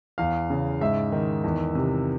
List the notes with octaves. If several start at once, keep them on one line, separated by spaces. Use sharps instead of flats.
E2 F5
C#3
G#2 E5
D#3
E2
C3